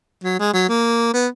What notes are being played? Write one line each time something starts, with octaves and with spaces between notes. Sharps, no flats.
F#3
G#3
F#3
A#3
B3